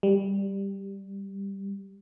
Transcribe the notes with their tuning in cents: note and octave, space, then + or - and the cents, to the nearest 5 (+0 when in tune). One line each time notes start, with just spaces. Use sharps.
G3 +5